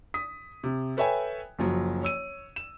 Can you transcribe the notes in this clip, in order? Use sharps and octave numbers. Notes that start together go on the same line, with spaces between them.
D#6 B6
C3
A4 B4 C#5 E5 G5 G#5
F#1 F3 F#3
C#5 E6 D#7
E7